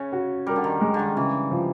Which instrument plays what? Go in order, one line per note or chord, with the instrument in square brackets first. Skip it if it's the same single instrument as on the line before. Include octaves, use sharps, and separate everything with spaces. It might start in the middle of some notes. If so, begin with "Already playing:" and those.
Already playing: [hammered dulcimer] C#3 [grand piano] C#4
[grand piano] F#4
[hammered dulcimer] G3 [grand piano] A#4
[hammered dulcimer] D3
D#3
[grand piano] G#3
[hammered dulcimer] D3 D#3
[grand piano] C#3 [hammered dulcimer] E3
[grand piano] F3